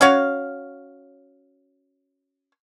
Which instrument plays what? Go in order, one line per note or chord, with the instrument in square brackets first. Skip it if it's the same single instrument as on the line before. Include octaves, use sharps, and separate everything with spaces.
[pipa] C#4 F#4 C#5 F5